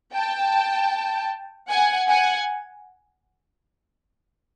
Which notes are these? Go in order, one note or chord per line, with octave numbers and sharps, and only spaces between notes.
G5 A5
F#5 G#5
F#5 G#5